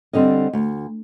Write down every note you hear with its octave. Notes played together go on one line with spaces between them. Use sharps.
D3 G3 C4 D#5
D2